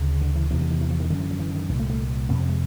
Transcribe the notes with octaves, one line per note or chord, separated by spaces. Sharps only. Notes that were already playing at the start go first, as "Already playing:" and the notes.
Already playing: D2 C#3
D3
E3
E2 C3 E3
D3
D#3
E3
F3
D#3
F#2 D3 D#3
E3
F3
E3
D#3
C2 A#2 D#3
A3
A3
F2 C3 A#3
C4
G#3